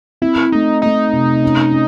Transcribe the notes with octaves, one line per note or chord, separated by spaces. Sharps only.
C4 E4
A3 D#4
A3 D#4
C3
C#4
C#4